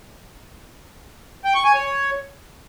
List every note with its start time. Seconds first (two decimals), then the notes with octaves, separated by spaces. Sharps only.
1.45 G5
1.55 C#6
1.64 G#5
1.74 C#5